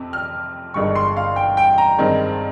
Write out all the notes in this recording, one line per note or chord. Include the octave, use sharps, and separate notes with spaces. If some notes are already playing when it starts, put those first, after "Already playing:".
Already playing: F2 C3
F6
G1 G2 D#3 G#3 C#6
C6
F5
G5
G5
A#5
G2 D#3 G#3 C4